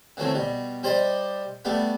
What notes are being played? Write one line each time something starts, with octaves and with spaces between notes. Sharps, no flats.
D3 E3 F#3 A3 C4
B2 G3
G3 G4 C5 D5 D#5
G3 A3 B3 D4